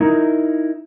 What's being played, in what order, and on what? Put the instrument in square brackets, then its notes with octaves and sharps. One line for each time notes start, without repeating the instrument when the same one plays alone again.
[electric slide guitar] D#4 E4 A#4